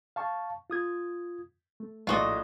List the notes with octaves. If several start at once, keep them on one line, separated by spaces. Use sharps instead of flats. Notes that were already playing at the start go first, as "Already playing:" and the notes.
F5 A5 C#6
F4 D#6 G#6
A3
A#1 A2 F4 F#4 D#5 D6